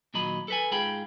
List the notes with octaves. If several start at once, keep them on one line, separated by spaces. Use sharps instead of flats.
A#2 D#3 F#3 D#5 B5
A4 B4 G#5
G#2 F4 G#4 G5 B5